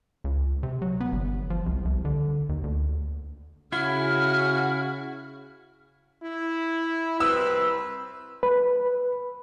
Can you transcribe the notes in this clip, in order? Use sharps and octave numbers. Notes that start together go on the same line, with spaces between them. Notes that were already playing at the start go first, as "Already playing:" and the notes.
C#2
C3
F#3
B3
G1
F3
C2
C2
D3
D#2
D2
C#3 E4 F#4 F6
E4
C2 C4 B4 E6
B4